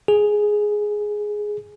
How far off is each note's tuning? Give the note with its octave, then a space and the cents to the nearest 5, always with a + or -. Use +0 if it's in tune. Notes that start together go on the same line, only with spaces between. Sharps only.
G#4 +5